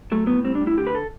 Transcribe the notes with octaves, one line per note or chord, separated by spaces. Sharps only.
F#3 A3
A2 B3
G3 C4
D4
A2
E4
D3 G4
B4
A4